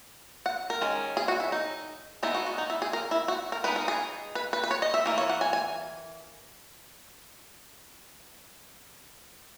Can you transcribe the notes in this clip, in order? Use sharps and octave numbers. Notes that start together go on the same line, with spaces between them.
F#5
A#4
D#3 G#3 C#4
G#4
F#4
E4
D#4
G#3 B3 D#4 E4
F#4
F#4
D#4
E4
G#4
A#4
E4
F#4
A#4
G#3 B3 D#4 B4
A#4
G#4
B4
B4
B4
C#5
D#5
E5
E3 A#3
C#5
F#5
G#5
G#5